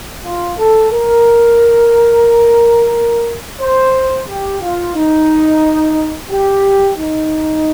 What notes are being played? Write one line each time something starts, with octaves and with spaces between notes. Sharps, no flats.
F4
A4
A#4
C5
G4
F4
D#4
G4
D#4